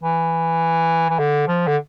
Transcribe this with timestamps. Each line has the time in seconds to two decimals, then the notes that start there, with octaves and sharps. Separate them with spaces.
0.03 E3
1.09 E3
1.19 D3
1.48 F3
1.67 D3